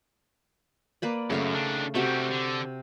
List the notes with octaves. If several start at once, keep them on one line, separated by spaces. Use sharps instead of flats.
A#3 B4 D5
F#2 C#3 A3 F5
D#3 D4
C3 G3 A3 F#4 A#5
D3